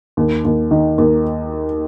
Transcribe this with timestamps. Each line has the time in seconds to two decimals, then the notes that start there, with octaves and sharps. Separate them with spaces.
0.17 D#2
0.45 D#2
0.71 D#3
0.98 D#2